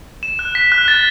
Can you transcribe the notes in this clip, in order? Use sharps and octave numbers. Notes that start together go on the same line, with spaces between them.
E7
F#6
B6
F#6
A6